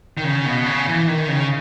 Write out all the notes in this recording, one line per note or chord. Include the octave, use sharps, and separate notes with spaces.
D#3
C#3
B2
C#3
E3
D#3
C#3